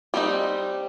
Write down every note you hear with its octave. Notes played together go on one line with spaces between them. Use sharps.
G3 C4 D#4